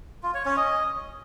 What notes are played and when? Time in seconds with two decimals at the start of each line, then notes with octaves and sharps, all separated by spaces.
0.23 F4
0.34 C#5
0.46 C#4
0.57 D#5